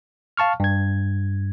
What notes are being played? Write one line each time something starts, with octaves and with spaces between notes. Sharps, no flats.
F5 A5 C#6 F6
G2 G#6